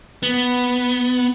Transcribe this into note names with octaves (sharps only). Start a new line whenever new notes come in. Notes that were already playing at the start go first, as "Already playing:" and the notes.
B3